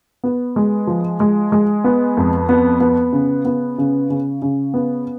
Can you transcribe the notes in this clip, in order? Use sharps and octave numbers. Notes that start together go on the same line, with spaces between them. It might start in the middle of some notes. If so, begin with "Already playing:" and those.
B3
G#3
F3
G#3
G#3
B3
F2
B3
B3
C#3
B3
C#3
C#3
C#3
B3